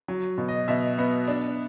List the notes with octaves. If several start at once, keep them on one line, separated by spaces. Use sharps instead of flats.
F#3
B2
D#5
B2 E5
B3
D4